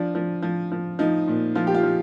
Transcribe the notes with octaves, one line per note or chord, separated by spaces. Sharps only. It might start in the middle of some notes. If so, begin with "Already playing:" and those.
Already playing: F3 D4
F3
F3
F3
F3 D#4
A#2
F3 F4
G4
F4
F3